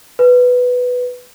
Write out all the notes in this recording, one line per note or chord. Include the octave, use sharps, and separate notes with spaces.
B4